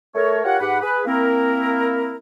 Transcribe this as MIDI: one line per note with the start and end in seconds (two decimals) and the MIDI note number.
0.15 0.43 57
0.15 0.43 70
0.15 0.43 73
0.44 0.59 65
0.44 0.59 67
0.44 0.59 70
0.44 0.59 73
0.44 0.59 78
0.60 0.81 44
0.60 0.81 67
0.60 0.81 71
0.60 0.81 78
0.81 1.02 68
0.81 1.02 71
1.06 2.16 58
1.06 2.16 60
1.06 2.16 64
1.06 2.16 70